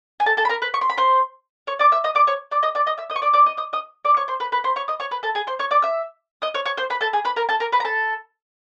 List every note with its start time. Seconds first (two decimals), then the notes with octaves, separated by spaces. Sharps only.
0.20 G#5
0.26 A4 A5
0.37 A4 A5
0.45 B5
0.49 A#4 A#5
0.62 B4 B5
0.74 C#6
0.81 C6
0.90 B5
0.97 C5 C6
1.67 C#5 C#6
1.79 D5 D6
1.92 E5 E6
2.04 D#5 D#6
2.15 D5 D6
2.27 C#5 C#6
2.51 D5 D6
2.63 D#5 D#6
2.75 D5 D6
2.87 D#5 D#6
2.98 E5 E6
3.10 D#5 D#6
3.16 C#6
3.22 D5 D6
3.33 D5 D6
3.46 D#5 D#6
3.57 D#5 D#6
3.73 D#5 D#6
4.05 D5 D6
4.17 C#5 C#6
4.28 C5 C6
4.40 B4 B5
4.52 B4 B5
4.64 C5 C6
4.76 C#5 C#6
4.88 D#5 D#6
5.00 C#5 C#6
5.11 B4 B5
5.23 A4 A5
5.35 G#4 G#5
5.47 C5 C6
5.59 C#5 C#6
5.71 D5 D6
5.82 E5 E6
6.42 D#5 D#6
6.54 C#5 C#6
6.65 C#5 C#6
6.77 C5 C6
6.90 B4 B5
7.01 A4 A5
7.13 G#4 G#5
7.25 B4 B5
7.36 A#4 A#5
7.49 A4 A5
7.60 A#4 A#5
7.72 B4 B5
7.80 A#5
7.85 A4 A5